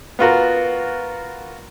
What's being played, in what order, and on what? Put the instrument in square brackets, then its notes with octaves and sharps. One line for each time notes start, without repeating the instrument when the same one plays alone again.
[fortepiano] B3 F4 F#4 A#4